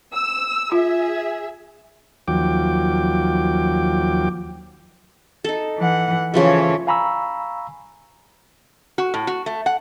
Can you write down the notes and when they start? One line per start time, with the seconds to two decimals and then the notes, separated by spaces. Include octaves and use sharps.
0.14 E6
0.72 F4 G#4 E5
2.28 D#2 F3 F#3 G5 D6
5.44 D#4 A4
5.78 E3 F#5
6.34 C#3 E3 F3 A3 C#5
6.87 F5 G#5 A#5 B5 C#6 E6
8.98 F#4
9.14 A2
9.27 F#4
9.46 A3
9.66 F#5